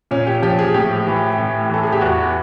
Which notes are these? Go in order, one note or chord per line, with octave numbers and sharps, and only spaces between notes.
A#2 C#4
G4
F3 G4
G#4
A2 G4
E3
A2
E3 A4
G#4
G4
E2 F#4